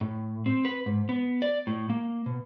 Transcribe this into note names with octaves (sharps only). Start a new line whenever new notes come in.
A2
C4
B4
G#2
B3
D5
A2
A#3
B2